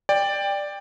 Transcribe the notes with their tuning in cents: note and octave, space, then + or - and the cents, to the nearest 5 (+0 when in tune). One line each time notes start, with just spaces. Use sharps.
D5 +5 G5 +20